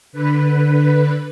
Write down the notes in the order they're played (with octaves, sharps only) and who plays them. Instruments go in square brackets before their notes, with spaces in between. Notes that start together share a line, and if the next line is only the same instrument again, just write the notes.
[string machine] D3 B4